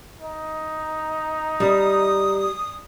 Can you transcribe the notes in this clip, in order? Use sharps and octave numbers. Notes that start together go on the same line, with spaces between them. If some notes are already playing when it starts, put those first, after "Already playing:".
D#4
G3 D#6